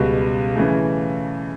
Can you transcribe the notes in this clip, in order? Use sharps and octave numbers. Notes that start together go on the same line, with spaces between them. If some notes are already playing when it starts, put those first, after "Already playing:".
Already playing: C#2 B2 G3
C#3 E3 A3